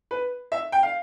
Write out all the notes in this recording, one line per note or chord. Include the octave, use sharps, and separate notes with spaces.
B4
E5
G5
F5